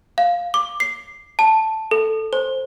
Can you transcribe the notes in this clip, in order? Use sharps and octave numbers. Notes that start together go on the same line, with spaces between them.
F5
D6
C7
A5
A4
C5